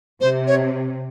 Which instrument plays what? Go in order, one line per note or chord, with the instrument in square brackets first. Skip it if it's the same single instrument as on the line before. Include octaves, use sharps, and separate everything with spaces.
[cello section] C3 [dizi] C5
[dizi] C#5